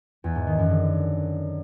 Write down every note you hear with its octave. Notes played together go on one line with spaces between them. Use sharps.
E2
G#2
D#3
F#2
D3